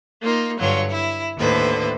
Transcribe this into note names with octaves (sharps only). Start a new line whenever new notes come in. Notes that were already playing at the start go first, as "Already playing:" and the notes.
A#3 D#4 F4
G2 D3 F#3 F4 C#5
E4
D#2 A2 D3 B4 C5